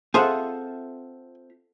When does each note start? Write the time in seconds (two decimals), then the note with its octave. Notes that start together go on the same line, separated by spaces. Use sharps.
0.14 C4 F4 G#4 A4 C5 E5 F#5